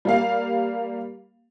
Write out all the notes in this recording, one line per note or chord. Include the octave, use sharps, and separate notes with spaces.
G3 A#3 F5